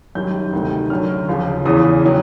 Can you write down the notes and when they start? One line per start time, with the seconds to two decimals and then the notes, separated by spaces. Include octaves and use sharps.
0.15 F#2 D#3 G3 G6
0.53 D2 C3 D#3 G3
0.90 F#2 D3 F#3 F6
1.28 D#2 C#3 F3
1.65 E2 C#3 E3 D#6
2.05 D#3 F#3